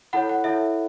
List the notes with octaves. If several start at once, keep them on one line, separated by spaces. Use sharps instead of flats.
E4 A4 C#5 F#5 B5
F#5
E4 A4 C#5 E5